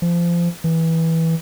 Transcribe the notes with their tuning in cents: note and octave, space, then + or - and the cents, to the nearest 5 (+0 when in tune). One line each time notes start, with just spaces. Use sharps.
F3 -25
E3 -15